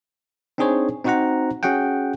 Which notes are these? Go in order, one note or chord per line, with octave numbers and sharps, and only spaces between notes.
C4 D4 D#4 G#4 C5 C#5
C4 D#4 F#4 C5 F#5 A#5
C#4 F#4 G#4 F#5 G5